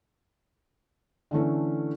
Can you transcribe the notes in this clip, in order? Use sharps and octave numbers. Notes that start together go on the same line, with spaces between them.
D3 E3 A3 C#4